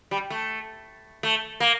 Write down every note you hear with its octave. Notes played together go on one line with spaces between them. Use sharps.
G3
A3
A3
A#3